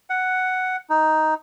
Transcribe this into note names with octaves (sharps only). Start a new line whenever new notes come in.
F#5
D#4